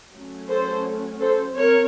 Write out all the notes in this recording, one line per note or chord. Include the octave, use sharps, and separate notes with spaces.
F#3 A3 C#4
A4 C5
A4 C5
C4 A#4 C#5